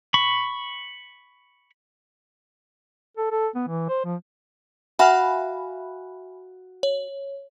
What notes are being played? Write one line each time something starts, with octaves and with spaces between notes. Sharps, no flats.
B5 C#6
A4
A4
B3
E3
C5
F3
F#4 E5 F5 G#5 B5
C#5